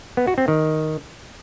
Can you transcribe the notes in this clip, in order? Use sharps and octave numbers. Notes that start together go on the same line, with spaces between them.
B3
F#4
C4
D#3